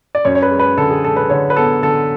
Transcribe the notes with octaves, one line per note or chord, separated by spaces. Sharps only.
D5
F#2 C#5
C#5
B4
G#3
B4
D3 A4
G#4
G#3 A4
B4
D3 C#5
B4
B3 A4
D3 A4